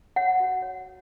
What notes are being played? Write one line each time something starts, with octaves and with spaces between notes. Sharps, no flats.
C#5 F#5
F#4
C#5